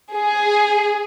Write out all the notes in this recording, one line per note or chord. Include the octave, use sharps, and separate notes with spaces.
G#4